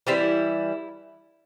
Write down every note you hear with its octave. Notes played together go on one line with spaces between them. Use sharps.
E3 G3 C4 E4